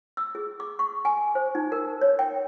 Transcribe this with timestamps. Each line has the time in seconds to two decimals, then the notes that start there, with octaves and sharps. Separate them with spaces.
0.17 E6
0.35 G#4
0.60 D6
0.79 C#6
1.05 G#5
1.35 C5
1.55 D#4
1.72 A#4
2.01 C#5
2.19 G5